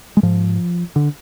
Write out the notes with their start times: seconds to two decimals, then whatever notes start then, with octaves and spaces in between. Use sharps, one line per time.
0.17 G#3
0.23 G#2 F3
0.96 D3